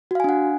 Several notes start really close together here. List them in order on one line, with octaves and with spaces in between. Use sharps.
F#4 F5 G#5 D4 F#5